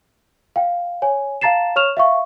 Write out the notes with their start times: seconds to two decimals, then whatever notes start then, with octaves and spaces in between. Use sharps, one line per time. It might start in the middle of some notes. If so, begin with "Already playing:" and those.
0.56 F5 G5
1.02 C#5 G#5
1.41 F5 A5 A#5 A6 C7 E7
1.76 C#5 C#6 F6 E7 F7
1.97 E5 F5 C#6